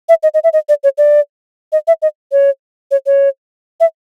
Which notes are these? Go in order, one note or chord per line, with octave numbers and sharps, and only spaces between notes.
E5
D#5
D#5
E5
D#5
D5
C#5
D5
D#5
E5
D#5
C#5
C#5
C#5
E5